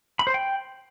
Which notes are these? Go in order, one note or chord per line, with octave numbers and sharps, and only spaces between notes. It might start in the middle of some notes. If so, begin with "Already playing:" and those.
B5
C5
G5